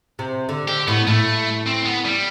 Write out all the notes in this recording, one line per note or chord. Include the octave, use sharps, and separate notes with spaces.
C3
D3
D3 G4
A2 B3
A2 A3
C4
B3
G3